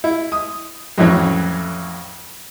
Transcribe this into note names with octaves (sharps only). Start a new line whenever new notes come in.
E4
D#6
F2 A2 E3 F#3 C#4